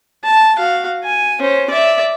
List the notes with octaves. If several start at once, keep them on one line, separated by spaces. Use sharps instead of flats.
A5
F#4 F5
G#5
C#4 C5
D5 E5